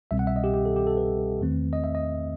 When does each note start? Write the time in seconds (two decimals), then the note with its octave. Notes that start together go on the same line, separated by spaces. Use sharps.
0.11 C2 B2 G3 C4 E5
0.19 F#5
0.27 E5
0.36 D#5
0.44 G4
0.54 G4
0.65 A4
0.76 G4
0.87 A4
0.97 B4
1.41 E2 D#3 A3 C4
1.73 D#5
1.84 E5
1.95 D#5